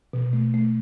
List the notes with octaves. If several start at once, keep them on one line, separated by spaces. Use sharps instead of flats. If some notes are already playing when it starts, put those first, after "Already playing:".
B2
A3
A3